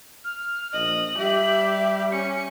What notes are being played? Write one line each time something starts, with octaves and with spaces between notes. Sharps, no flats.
F6
A#1 D#5 F#7
G3 G4 E5
C#4 C#7